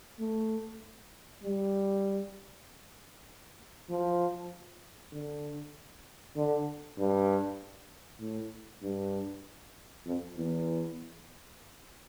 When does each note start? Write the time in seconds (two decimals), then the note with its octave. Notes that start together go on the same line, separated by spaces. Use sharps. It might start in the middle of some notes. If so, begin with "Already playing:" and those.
0.19 A3
1.43 G3
3.89 F3
5.12 D3
6.36 D3
6.98 G2
8.20 A2
8.82 G2
10.06 F2
10.36 E2